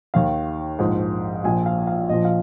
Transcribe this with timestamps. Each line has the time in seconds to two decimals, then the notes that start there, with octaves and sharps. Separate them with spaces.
0.14 D#2 D#3 F5
0.79 A#1 G#2 F3
1.44 A#1 A#2 F3 G#5
1.66 F5
1.87 F5
2.09 A#1 A#2 F3 D#5
2.25 F5